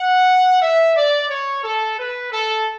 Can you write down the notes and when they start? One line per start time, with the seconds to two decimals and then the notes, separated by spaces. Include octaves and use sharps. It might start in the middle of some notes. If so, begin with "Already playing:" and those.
Already playing: F#5
0.61 E5
0.96 D5
1.30 C#5
1.64 A4
1.99 B4
2.32 A4